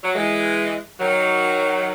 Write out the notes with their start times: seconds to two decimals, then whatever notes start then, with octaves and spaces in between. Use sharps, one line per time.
0.03 F#3
0.14 E3 G#3
0.99 D#3 F#3